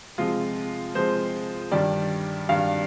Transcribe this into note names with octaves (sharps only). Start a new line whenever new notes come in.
C3 F3 G#3 F4
C3 F3 G#3 C5
G2 D#3 G3 D5
G2 D#3 G3 F5